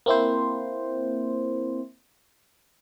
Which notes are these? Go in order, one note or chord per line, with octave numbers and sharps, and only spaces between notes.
A#3 C4 E4 C5